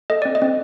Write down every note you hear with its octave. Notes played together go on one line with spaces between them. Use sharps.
A4 D#5
C4 D5
D#5
C4